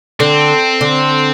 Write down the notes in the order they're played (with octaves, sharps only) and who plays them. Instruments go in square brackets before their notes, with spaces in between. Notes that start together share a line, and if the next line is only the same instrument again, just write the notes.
[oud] D3 [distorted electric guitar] C4
[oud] D3